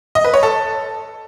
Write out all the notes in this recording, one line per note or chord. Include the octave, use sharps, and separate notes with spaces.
D#5
B4
C#5
A4